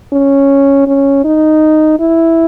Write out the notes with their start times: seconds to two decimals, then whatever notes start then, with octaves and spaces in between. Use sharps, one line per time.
0.13 C#4
0.87 C#4
1.25 D#4
2.00 E4